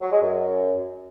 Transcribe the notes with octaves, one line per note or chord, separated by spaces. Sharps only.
F#3
G#3
F#2